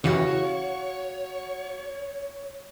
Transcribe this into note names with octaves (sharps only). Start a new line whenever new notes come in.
C#3 E3 F#4 G4 C#5 F5 F#5